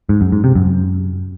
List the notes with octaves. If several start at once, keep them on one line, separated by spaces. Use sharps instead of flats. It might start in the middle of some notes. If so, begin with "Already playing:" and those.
G#2
F#2
G#2
C3
F#2